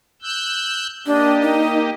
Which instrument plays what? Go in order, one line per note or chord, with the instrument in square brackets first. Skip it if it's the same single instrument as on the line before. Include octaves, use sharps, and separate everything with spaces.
[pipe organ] E6 F#6 G6
[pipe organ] A#3 G4 D#5 [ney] D4
[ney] D#4